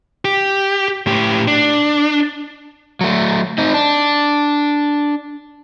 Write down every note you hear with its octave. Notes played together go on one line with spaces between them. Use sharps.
G4
A2 G4
D4
F#3 A3
C4 D#4
D4